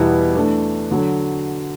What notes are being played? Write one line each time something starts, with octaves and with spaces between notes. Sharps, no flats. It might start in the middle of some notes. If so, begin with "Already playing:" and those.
Already playing: E2 B2 G3 B3 E4
E3 A3 D4
D3 F#3